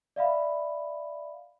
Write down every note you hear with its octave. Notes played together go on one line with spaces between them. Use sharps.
D5 E5 F5 B5